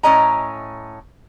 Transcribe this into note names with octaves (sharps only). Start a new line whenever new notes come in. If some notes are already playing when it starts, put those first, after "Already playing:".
A2 C#4 D#5 A#5